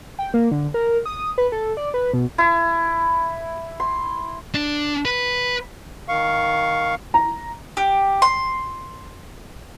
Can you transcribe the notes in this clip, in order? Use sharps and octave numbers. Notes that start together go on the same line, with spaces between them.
G5
A#3
D3
A#4
D#6
B4
A4
D5
B4
B2
E4
C6
D4
B4
D#3 F5 C#6
A#5
G4
C6